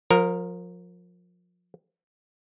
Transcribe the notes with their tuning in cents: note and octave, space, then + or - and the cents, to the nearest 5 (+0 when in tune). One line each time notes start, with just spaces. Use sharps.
F3 +30 A#4 -5